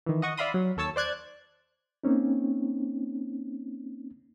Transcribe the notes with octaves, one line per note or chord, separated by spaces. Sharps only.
D#3 E3
D#5 F#5 C#6 D#6
D5 E5 F5 B5 C6 D#6
F#3
D#2 A4 C#5 A5 E6
C5 D5 F#6 G#6
A#3 C4 C#4 D#4